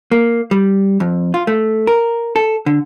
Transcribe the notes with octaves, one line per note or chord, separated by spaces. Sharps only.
A#3
G3
F2
F4
A3
A#4
A4
D3